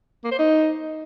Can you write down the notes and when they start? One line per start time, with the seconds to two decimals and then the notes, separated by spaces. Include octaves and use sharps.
0.24 A#3
0.32 C5
0.39 D#4